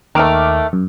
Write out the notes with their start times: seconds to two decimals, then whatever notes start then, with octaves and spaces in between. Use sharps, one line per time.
0.15 D#2 D#3 A3 D6 F6
0.73 F#2